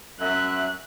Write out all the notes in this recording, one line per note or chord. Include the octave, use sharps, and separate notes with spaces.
F#2 E5 F#6